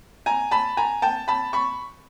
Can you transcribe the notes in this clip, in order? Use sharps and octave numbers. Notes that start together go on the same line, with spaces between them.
G#5 A#5
A5 B5
G#5 A#5
G5 A5
A5 B5
B5 C#6